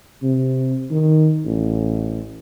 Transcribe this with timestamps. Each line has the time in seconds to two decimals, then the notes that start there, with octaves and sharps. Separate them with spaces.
0.23 C3
0.91 D#3
1.45 A1